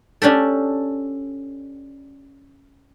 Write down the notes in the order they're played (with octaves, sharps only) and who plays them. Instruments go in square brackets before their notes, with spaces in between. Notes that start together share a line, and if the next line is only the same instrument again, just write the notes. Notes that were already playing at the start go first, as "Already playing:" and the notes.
[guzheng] C#4 D4 G4 A4